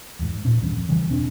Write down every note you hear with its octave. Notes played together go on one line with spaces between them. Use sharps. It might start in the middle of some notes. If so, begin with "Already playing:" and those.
E2 G#2
A#2 C#4
G#1 E2 G2
F2
C#3 E3 G3 A#3
E1 C4 D4